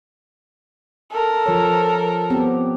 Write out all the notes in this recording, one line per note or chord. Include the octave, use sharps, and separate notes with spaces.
A4 A#4
F3 C#5
B3 C4 G4